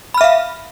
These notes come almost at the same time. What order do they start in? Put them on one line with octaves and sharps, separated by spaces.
B5 F6 E5 F5